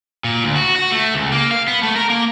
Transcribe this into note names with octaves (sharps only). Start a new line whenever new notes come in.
A#2
D2
F#4
F#4
A3
C#2
A#3
F5
B3
A3
A#4
A#3